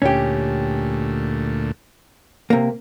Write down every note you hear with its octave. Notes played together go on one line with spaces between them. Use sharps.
D2 A#2 A3 C#4 G4
C3 A#3